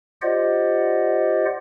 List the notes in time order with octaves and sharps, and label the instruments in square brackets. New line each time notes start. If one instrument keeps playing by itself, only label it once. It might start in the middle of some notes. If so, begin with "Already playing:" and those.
[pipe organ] F4 G4 C5 D5 D#5 F#5